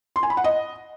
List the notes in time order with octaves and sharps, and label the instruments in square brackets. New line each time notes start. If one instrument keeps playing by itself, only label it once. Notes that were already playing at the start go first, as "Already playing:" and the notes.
[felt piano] C6
G#5
B5
F#5
D#5